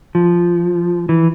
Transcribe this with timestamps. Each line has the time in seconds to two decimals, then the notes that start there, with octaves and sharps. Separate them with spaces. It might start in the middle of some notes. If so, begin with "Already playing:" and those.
0.15 F3
1.09 E3